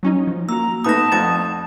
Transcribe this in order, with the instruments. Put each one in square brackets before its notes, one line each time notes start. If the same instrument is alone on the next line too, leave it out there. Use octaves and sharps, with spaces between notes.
[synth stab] F#3 C#4 D#4
F3
[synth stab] A#3 F#4 [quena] A#5 [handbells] E6
[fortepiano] A3 B3 D#4 [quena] A5 [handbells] D#6 A#6
[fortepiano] F2 [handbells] A3 D#6 A6 [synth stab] F#5